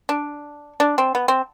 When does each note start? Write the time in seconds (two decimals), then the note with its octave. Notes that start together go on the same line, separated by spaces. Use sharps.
0.09 D4
0.80 D4
0.98 C4
1.15 B3
1.28 C4